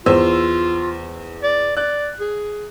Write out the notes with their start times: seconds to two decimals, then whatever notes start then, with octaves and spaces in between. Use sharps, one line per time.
0.06 E2 F4 C5 E6
1.43 D5
1.77 D5 F#6
2.20 G#4